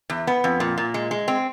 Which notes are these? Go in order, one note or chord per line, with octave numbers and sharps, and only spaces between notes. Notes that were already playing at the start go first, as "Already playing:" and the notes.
E2
B3
F2
A#2
A#2
G#3
G#3
C4